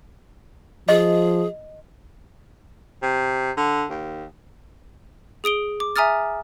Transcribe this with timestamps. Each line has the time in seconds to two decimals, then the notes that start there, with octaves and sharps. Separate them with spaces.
0.89 F3 G#4 D#5
3.02 C3
3.57 D3
3.90 D#2
5.44 G#4 D#6 D7 G7
5.80 D6
5.96 E5 G#5 A#5 D#6 F6 A6